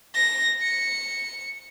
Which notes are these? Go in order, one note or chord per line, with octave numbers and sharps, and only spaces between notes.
A#6
C#7